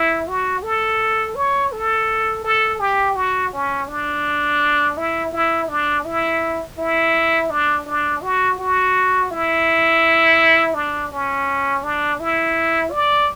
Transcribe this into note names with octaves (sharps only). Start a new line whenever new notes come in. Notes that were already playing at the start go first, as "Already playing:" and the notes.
Already playing: E4
F#4
A4
C#5
A4
A4
G4
F#4
C#4
D4
E4
E4
D4
E4
E4
D4
D4
F#4
F#4
E4
D4
C#4
D4
E4
D5